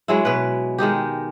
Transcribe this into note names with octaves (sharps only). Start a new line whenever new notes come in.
F#3 G#3 E4
B2 B4
D#3 G#3 D#4 G4